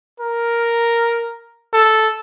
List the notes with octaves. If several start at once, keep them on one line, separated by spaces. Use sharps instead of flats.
A#4
A4